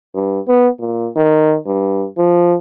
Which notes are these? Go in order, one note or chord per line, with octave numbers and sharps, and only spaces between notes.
G2
B3
A#2
D#3
G2
F3